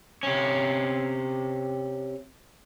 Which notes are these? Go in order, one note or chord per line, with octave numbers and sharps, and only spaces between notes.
C3 C#4